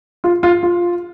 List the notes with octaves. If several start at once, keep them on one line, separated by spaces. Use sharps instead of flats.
F4
F4
F4